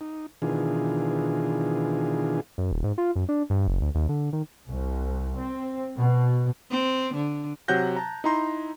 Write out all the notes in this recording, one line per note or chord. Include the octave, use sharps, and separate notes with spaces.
D#4
B2 D#3 E3 D4 F4 G#4
F#2
D#1
G#2
F4
F#2
D4
G2
F#1
D2
D#2
D3
D#3
C2
C4
B2
C4
D3
C3 F#3 F#5 F#6 G6 A#6
A5 A#5
D#4 E4 A#5 C6